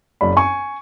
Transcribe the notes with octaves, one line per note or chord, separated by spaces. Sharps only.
F#1 F#2 D5 B5
G#5 C#6